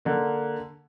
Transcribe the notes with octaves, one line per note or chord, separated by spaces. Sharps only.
D3 A#3